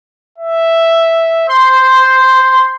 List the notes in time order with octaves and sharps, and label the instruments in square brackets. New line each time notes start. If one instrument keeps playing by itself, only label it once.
[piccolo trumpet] E5
[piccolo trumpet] C5 [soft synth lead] C6